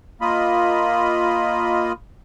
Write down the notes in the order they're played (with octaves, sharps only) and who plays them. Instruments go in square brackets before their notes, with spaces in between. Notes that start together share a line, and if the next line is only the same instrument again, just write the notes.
[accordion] A#3 F4 D#5 B5